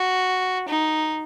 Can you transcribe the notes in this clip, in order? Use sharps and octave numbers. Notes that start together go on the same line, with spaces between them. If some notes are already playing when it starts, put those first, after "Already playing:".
Already playing: F#4
D#4